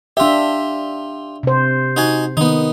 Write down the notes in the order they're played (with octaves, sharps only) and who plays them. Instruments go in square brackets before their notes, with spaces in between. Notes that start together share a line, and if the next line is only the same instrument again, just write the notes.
[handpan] D4 E5 [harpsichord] F4 G4
[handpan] C3 C5
[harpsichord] D#4 F#4 G#5
[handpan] D#3 [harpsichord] B3 D#4